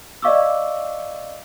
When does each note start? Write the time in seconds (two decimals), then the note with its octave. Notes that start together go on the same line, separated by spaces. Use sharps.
0.22 D5 D#5 F5 C#6 D6 E6